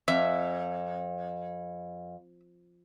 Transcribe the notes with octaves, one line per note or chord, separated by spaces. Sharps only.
F2 E5